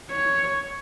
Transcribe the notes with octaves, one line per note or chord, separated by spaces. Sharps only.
C#5